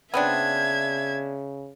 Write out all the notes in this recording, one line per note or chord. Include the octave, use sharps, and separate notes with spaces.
C#3 B3 C4 D4 E5 G#6